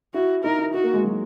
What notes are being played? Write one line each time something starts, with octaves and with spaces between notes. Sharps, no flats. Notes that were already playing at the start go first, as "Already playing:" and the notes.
E4 F#4
D#4 A#4
E4
D#4 F#4
A#3
G#3
F#3